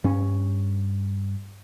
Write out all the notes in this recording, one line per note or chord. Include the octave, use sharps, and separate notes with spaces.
G2 C#4